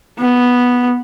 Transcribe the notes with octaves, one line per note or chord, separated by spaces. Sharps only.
B3